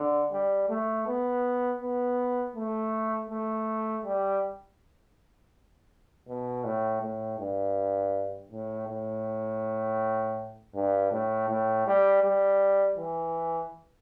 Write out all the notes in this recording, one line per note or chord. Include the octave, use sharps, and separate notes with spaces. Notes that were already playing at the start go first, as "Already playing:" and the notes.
Already playing: D3
G3
A3
B3
B3
A3
A3
G3
B2
A2
A2
G2
A2
A2
G2
A2
A2
G3
G3
E3